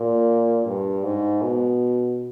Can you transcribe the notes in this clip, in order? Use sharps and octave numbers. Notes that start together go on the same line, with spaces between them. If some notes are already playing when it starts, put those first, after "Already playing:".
Already playing: A#2
G2
G#2
B2